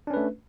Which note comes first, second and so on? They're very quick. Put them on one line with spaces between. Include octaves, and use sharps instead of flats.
D4 C#4 B4 A3